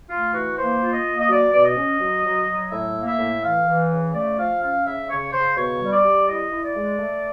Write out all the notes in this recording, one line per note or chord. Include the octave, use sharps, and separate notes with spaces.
A3 F4
E3 F#4
A#3 C5
F4
D#5
A#3
D#5
F#3 D5
B2 D5
D#5
C#4
F#3
F#3
F#3
A2 E5
A#3
E5
A2
E3 F5
E3
C#3
A3 D5
F3 F5
C#4 F5
C#3 E5
C#3 C#5
C#3 C5
B2 C#5
G3
D5
G3
E4 D#5
E4
D5
G#3
A3